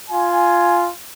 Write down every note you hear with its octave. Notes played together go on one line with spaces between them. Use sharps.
F4 G#5